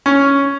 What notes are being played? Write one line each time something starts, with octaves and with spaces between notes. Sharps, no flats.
C#4